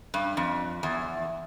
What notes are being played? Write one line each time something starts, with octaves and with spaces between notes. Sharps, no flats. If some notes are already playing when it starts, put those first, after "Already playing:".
G2
F2
E2